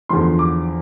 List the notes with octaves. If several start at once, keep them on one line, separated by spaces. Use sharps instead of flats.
E2 D3 F3 C6
D6